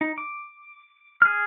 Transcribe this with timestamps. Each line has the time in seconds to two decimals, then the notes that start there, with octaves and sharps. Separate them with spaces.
0.01 D#4
0.18 D6
1.22 G#4 F6